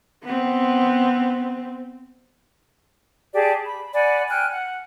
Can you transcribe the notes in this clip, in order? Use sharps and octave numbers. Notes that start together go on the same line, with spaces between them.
B3 C4
G4 G#4 D5 A5
B5
D5 F#5 G#5 B5
G5 G#5 F6 F#6
F#5